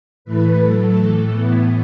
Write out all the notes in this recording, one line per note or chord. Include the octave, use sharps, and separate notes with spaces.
A2 E3 A3 B4
A2 F#3 A3 A4
A2 E3 A3
A2 E3 B3